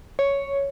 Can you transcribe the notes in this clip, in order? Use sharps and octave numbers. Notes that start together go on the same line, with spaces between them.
C#5